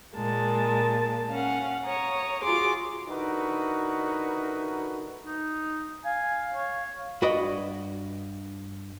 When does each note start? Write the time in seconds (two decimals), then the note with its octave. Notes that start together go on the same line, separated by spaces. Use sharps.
0.15 A#2 G#3 A#3 A5
1.31 C#4 F5 F#5
1.83 C#5 A#5 D#6
2.43 F4 F#4 G#4 C6 D6
3.07 D3 D#4 E4 F#4 A#4 B4
5.25 D#4
6.04 F5 G#5
6.54 C#5
7.22 G2 F#4 B4 D5 D#5 B5